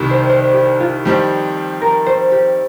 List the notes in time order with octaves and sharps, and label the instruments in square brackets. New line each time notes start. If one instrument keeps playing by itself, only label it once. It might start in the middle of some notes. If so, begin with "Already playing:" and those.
Already playing: [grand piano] C2 C3 D#3 [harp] G4
[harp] C5
C5
G4
F4
[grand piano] F2 D#3 G3 C4 [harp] G4
[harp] A#4
C5
G4